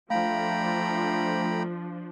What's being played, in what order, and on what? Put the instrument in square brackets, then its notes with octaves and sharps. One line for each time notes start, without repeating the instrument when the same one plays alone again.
[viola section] F3 D4 [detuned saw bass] A3 [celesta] F5 [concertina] G5 A#5 B5